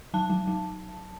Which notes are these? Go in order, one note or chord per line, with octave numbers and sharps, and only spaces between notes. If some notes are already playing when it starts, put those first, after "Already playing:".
F#3 A5
F#3
F#3